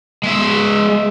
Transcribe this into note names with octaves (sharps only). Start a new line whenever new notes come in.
G#3 E5